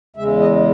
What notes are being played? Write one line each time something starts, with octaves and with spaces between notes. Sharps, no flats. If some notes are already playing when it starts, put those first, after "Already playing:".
E2 C#3 G#3 E5
D#5